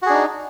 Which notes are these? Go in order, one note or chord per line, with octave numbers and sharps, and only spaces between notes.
D4 D#4 F#4 G#4